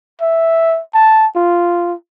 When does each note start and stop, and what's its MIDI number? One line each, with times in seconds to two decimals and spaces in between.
0.21 0.80 76
0.94 1.26 81
1.35 1.93 65